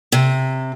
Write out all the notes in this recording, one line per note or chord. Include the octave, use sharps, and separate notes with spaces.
C3